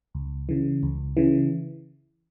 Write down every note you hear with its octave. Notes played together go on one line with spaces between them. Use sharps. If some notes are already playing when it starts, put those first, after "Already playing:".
C#2
C#3 E3
C#2
C#3 E3